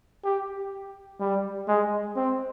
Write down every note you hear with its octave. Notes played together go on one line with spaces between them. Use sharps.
G4
G3
G#3
C4